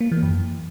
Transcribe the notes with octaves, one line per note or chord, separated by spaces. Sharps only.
A#3
E3
F#2